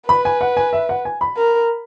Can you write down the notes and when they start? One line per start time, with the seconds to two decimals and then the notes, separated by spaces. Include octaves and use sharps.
0.08 B4 B5
0.25 G#5
0.41 F#5
0.57 G#5
0.73 E5
0.89 F#5
1.05 G#5
1.21 B5
1.37 A#4